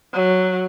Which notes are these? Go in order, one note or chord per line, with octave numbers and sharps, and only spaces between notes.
F#3